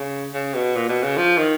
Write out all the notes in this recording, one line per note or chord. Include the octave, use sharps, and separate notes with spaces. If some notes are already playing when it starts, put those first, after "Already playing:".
Already playing: C#3
C#3
B2
A#2
B2
C#3
F3
D#3